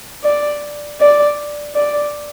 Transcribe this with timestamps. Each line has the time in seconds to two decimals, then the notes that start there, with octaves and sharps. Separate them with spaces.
0.24 D5
1.00 D5
1.75 D5